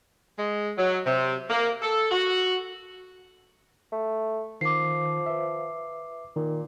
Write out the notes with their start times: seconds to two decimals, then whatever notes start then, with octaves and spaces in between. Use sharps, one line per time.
0.37 G#3
0.78 F#3
1.06 C3
1.50 A#3
1.82 A4
2.12 F#4
3.92 A3
4.61 D#3 F3 D6 C7
5.26 B4 E5
6.36 A#2 D#3